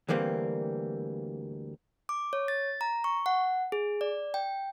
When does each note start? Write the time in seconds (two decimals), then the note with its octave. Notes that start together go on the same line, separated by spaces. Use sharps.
0.08 D2 E3 G3 A#3 C4
2.09 D6
2.33 C#5
2.48 A6
2.81 A#5
3.04 C#6
3.26 F#5
3.72 G#4
4.01 D5
4.34 G5